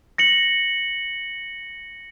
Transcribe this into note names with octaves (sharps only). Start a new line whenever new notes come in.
A#6 C#7 F#7